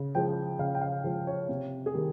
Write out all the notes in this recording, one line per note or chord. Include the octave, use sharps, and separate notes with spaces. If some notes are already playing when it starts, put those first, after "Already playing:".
Already playing: C#3
F3 G#3 G5
C#3 F5
G5
F5
F3 G#3
C#5
C3
G#4
D#3 G3 A#4